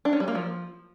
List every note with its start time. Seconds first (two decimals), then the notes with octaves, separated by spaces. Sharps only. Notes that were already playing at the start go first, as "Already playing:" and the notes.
0.05 D4
0.13 C#4
0.20 G3
0.28 A#3
0.35 F3